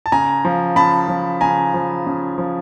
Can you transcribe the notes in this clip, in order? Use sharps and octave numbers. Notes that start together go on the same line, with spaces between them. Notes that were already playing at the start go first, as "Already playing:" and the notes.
A5
C#3 G#5 A#5
F3
C#3 A5 B5
F3
C#3 G#5 A#5
F3
C#3
F3